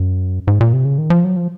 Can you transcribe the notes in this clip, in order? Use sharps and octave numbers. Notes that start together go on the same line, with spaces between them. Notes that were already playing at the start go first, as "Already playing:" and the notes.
Already playing: F#2
G#2
A#2
C3
C#3
D#3
F3
F#3
F3